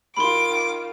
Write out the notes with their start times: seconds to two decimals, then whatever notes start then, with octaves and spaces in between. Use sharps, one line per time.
0.17 D#3 F4 B5 C6 D6